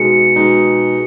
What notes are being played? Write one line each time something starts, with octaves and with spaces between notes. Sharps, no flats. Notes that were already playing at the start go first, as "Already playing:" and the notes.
Already playing: B2 G#3 D#4 F#4 C#7
B2 G#3 D#4